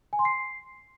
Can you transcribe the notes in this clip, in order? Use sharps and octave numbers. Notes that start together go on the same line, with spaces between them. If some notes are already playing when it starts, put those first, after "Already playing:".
G#5
C6
C7